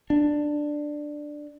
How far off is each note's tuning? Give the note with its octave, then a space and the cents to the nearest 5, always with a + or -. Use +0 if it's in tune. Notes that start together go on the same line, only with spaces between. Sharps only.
D4 +10